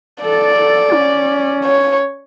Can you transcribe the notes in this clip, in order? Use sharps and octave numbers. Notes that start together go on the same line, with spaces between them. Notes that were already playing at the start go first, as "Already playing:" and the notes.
A4 D5
A4
C#4
C#5